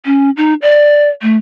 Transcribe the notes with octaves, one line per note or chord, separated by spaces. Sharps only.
C#4
D#4
D5
A3